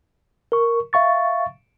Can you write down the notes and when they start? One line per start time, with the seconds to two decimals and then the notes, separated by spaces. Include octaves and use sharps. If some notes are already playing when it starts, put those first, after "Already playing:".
0.52 A#4 C#6
0.93 E5 F5 C#6 A6